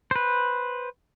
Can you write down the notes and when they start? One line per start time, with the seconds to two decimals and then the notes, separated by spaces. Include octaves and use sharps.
0.11 B4 C5